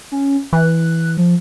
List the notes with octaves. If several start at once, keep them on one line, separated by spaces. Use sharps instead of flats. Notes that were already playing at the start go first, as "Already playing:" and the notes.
C#4
E3 F#6
F3